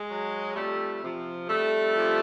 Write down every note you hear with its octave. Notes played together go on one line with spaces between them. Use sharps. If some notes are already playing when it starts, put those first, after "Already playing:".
Already playing: G#3
F#3
F2 G3 A3
C3 F3
F2 G3 A3
C3 F3